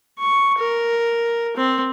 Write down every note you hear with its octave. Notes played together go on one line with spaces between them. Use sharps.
C#6
A#4
C4